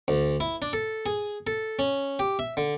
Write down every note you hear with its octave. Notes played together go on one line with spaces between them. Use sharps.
D2
E4
D4
A4
G#4
A4
C#4
G4
E5
D3